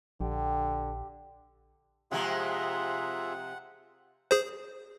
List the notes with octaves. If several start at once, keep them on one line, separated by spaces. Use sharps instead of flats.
A#1 D3 G4
C3 F3 G#3 F4 G#4 E5 F#5
G#4 C5